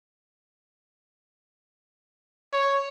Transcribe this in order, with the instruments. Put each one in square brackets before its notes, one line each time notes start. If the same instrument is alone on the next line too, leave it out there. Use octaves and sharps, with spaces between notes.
[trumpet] C#5